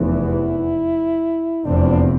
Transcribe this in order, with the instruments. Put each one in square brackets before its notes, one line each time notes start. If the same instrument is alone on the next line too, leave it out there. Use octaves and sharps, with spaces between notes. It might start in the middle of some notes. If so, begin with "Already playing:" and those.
Already playing: [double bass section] F1 E2 E3 [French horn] E4
[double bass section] F1 E2 C3 F3 C4 [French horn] D4